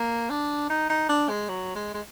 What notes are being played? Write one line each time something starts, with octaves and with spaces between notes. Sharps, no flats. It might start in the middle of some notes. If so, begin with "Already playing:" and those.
Already playing: A#3
D4
D#4
D#4
D4
G#3
F#3
G#3
G#3